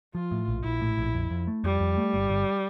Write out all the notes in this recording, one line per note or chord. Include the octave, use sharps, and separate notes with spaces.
F3 F4
A2
A#1
A#1 E4
A2
A#1
F2
F2
A3
F2 G3
F2
A3
G1
G1